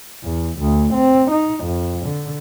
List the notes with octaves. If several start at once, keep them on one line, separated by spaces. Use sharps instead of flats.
E2
D2
C4
D#4
F2
D3